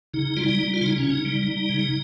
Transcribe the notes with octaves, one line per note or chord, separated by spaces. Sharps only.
C#3 D#4
G3 F4
D#4
G3
F4
C#3 D#4
C#4
C#3
D#4
G3
G3
C#3